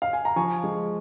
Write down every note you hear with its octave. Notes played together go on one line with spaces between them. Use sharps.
F5
G#5
A#5
F3 G#5 C#6
G#3